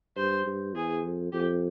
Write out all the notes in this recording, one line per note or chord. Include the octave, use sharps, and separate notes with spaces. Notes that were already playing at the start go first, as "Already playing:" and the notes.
G2 C5
G2
E2 G#4
F2
F2 G4